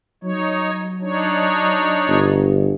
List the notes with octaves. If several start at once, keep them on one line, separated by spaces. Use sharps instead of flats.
F#3 D#4 C#5
D4 D#4 C#5
G1